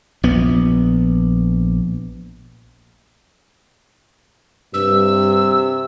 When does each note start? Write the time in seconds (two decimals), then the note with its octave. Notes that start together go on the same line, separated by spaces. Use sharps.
0.23 A#1 B3
4.74 G2 C3 E6